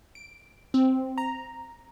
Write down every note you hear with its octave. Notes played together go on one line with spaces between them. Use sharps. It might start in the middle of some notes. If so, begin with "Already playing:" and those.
D7
C4
A#5